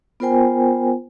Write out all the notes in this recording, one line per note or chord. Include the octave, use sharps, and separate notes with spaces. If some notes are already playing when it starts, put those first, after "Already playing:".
B3 F4 A#4 C5 G5 G#5